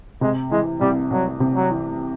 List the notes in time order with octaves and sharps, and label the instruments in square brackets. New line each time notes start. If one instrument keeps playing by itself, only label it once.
[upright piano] C3 [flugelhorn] G#3
[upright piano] E3 [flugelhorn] G#3
[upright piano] C2 [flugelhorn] G3
[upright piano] C2 [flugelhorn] F#3
[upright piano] C3
[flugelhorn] F#3
[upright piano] E3